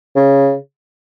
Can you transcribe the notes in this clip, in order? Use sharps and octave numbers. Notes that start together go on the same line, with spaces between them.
C#3